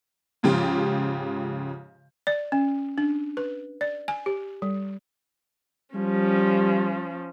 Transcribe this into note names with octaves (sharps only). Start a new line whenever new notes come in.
G#2 C#3 F3 F4 G4
D5
C#4
D4
B4
D5
G#5
G4
G3
F3 G3 C#4